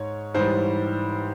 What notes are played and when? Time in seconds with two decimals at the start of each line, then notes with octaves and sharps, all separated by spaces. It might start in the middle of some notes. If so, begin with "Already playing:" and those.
Already playing: G#2 C#5
0.34 G#2 E3 G3 C5